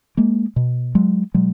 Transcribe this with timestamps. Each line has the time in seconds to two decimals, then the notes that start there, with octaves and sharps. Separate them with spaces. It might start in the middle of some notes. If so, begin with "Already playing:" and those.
0.17 G#3 A#3
0.56 B2
0.95 F#3 G#3
1.34 B2 F#3 G#3